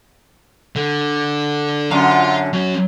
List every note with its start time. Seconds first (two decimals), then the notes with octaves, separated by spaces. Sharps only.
0.76 D3
1.91 F#2 D3 F5 C6
2.53 F#3 C#4